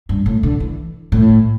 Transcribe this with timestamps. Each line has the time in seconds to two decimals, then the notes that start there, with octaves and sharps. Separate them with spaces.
0.09 G2
0.26 A2
0.43 D3
0.60 E3
1.12 A2